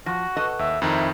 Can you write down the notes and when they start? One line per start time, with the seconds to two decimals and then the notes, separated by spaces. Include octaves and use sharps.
0.06 F3 F#4 A#6
0.37 A4 B4 D#5 F#5 C#6
0.59 D#2 E5
0.82 F2 D#3 E4 C5 E5 A#5 F#6